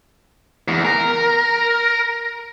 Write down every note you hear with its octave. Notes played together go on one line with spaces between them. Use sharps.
E2
A#4